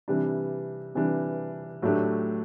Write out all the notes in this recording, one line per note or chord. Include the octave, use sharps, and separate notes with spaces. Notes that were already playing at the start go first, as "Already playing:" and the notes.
C3 E3 G3 D4
C3 E3 G3 D4
A2 F#3 A3 D4 G4